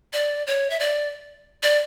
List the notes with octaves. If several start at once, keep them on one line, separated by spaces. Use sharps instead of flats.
D5
C#5
E5
D5
D5